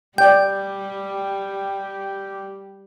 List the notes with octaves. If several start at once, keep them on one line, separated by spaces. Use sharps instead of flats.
G3 G4 D5 G5 G6